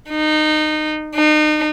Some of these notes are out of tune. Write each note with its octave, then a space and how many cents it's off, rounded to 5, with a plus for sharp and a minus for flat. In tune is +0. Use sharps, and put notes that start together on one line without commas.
D#4 -20
D#4 -35